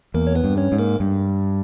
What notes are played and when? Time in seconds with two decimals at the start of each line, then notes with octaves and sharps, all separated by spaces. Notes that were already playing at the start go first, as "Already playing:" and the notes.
0.14 E2 A#3 A#4
0.27 C#5
0.35 B3 B4
0.44 G2
0.57 C#4 C#5
0.72 G#2
0.78 A#3 A#4
1.00 G2